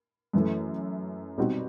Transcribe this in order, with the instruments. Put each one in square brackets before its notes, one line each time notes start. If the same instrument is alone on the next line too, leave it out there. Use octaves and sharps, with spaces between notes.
[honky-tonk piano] F#2 E3 A3
B2 G3 C4 D#4 F#4